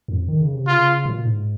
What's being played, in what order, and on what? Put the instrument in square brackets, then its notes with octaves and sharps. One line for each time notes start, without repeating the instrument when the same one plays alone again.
[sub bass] F2
D#3
C#3
C3
[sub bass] C#3 [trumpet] F4
[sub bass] A#2
G#2